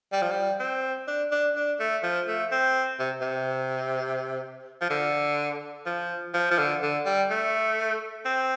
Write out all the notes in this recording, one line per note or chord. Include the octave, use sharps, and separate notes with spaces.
G3
F3
G3
C4
D4
D4
D4
A3
F3
A3
C4
C3
C3
F3
D3
F3
F3
F3
D3
D3
G3
A3
C4